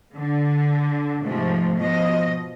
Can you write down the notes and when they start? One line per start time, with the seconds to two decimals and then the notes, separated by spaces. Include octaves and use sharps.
0.15 D3
1.22 G#2 C3 F3 A3
1.78 B2 F3 D#5